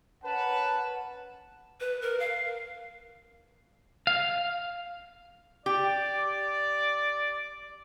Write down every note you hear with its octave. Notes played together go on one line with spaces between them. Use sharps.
C#4 A#4 B4 F#5 A5
B4
A#4
F5
F5
G4 D5